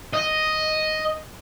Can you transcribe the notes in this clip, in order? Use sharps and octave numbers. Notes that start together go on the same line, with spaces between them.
D#5